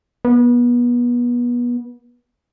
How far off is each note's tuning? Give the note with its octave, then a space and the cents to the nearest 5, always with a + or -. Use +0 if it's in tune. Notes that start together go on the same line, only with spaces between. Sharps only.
B3 -30